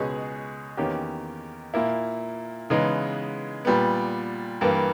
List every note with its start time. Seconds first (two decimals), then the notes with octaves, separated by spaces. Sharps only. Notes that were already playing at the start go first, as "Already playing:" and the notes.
Already playing: C#2 B2 G#3 C#4 G#4
0.77 E2 D#3 A#3 C#4 G4
1.74 A#2 A#3 E4
2.70 C#3 E3 G#3 B3 D#4
3.65 A#2 G3 B3
4.61 G2 E3 G3 A#3